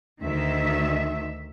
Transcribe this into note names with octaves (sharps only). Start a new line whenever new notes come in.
D2 D#3 E5